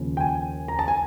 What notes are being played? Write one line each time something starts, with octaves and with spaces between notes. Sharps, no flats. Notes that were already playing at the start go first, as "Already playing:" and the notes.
Already playing: D#2 C#3 F3
G5
G#5
A#5
A5
G#5